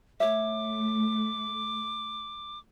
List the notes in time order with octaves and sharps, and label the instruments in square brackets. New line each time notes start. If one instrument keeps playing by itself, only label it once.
[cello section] A3 [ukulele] C#5 E5 [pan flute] D6